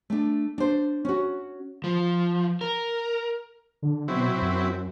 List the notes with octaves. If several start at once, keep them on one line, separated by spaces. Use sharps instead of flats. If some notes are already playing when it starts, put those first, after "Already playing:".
A3 D4
D4 C5
C#4 F#4
F3
A#4
D3
B2 F#3 C4 E4
F#2